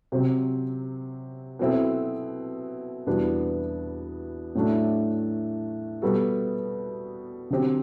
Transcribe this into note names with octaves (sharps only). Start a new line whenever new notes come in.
C3 F#3 C4
B2 F#3 C4 E4 A4
E2 B2 G3 B3 D4
A2 F#3 A3 D4
B2 G3 B3 F#4 A4
D3 F#3 C4 G4